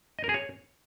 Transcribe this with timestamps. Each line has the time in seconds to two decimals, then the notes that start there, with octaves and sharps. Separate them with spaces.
0.19 D#5
0.24 A#4
0.29 G#4
0.34 C#5